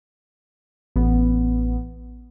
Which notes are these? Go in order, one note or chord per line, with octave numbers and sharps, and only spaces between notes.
A1 B3